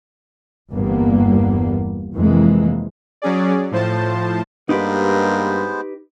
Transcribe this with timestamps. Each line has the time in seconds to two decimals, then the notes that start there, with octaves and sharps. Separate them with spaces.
0.71 G1 E2 G2 A#3 B3
2.14 F2 C3 E3 G#3 A#3
3.22 F#3 C#4 G#4 D5
3.71 A2 F3 C5 A5
4.69 G2 G#3 A#3 B3 D#4 G4 B4 C5